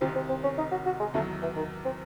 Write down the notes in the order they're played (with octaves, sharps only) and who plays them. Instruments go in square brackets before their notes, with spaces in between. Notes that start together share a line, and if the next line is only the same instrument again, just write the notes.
[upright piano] C2 C3 D#3 [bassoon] C4
[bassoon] C4
C4
C#4
D#4
F#4
F#4
G#3
[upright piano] E2 D#3 F#3 [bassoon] A3
[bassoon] E3
D#3
C4